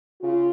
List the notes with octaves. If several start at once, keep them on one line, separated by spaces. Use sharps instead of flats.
C#3 F4